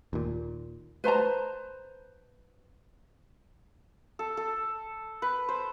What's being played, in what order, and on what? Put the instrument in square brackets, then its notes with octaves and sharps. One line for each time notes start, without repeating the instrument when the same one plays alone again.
[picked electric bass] D#2 A#2
[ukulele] B4 C5 A5 A#5
[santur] A4
A4
B4
C5